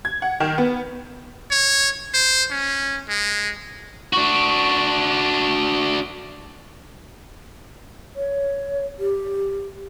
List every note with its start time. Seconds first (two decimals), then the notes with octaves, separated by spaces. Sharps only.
0.05 G#6
0.22 F#5
0.40 D#3
0.58 B3
1.51 C#5
2.14 C5
2.51 C#4
3.08 G#3
4.13 D4 F#4
8.16 C#5
8.99 G4